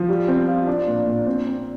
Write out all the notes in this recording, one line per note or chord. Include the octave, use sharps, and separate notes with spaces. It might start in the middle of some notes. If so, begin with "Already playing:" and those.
Already playing: F3
G3
C4
F4
D4
A#2
A#2
C4
C4